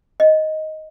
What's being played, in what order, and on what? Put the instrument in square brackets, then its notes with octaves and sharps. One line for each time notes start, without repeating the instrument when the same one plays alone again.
[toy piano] D#5